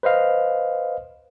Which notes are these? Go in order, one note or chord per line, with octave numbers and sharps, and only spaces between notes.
B4 C5 D#5 F5